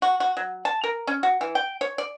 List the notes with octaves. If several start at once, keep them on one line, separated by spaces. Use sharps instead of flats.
F#4
F#4
F#3
A5
A#4
C#4
F#4
E3
G5
C#5
D5